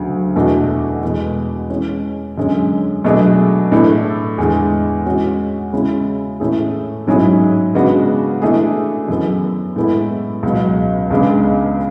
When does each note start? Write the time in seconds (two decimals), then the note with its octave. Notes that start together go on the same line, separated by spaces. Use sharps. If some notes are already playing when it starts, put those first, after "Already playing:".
Already playing: D2 C#3 F#3
0.36 E2 B2 A3 D4 F#4
1.03 E2 B2 G#3
1.70 E3 G#3 C#4
2.38 F#2 D3 G#3 C#4
3.04 B2 F#3 A3 D4 G#4
3.72 A2 E3 A3 D4 A4
4.38 E2 D3 G#3
5.06 E3 G#3 C#4 F#4
5.73 C#3 G#3 C#4 E4
6.40 A2 E3 A3 C#4 G#4
7.07 G#2 F#3 C#4 E4 G#4
7.75 C#3 G#3 B3 D4 F#4
8.42 E3 A3 D4 G#4
9.08 F#2 E3 B3
9.76 A2 G#3 B3 E4 A4
10.43 C#2 B2 F#3
11.10 C#2 C#3 G#3 B3 D4